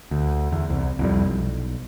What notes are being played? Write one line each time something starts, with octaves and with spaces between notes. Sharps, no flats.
D2
E2
C2
C2 F2 G3
B1